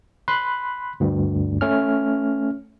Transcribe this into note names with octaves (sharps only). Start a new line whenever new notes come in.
B5 C6 F#6
D2 G2
A3 C#4 F6